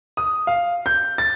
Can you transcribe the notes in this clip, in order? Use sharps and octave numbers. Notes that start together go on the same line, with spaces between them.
D#6
F5
G6
A6